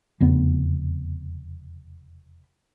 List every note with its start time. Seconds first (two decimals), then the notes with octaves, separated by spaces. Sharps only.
0.20 F1 E2 C#3 B3